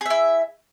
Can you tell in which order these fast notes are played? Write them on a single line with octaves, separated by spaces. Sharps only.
G#4 E5 E4